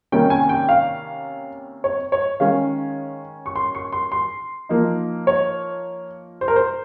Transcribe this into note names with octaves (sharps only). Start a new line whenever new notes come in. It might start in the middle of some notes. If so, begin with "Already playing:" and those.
C3 D#3 G3 A#3 C#4 G5
G#5
G5
F5
C#5
C#5
D#3 G#3 C#4 F5
C#6
C6
C#6
C6
C6
F3 A#3 D#4
C#5
C5
A#4
C5